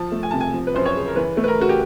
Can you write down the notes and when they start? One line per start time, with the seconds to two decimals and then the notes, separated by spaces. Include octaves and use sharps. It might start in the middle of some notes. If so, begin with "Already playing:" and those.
Already playing: F3 A5
0.12 A3
0.23 G#5
0.31 C3 A5
0.40 G#5
0.54 F3
0.67 B4
0.74 F#2 C5
0.85 C#5
0.95 C#3
1.07 A#4
1.16 E3 B4
1.37 A3
1.43 B4
1.48 A#4
1.58 C#3 F#4
1.69 G4